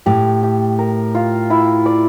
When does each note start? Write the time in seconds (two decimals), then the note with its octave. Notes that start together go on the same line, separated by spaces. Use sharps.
0.06 A2 G4
0.43 G4
0.79 A#4
1.15 F4
1.50 E4
1.86 D5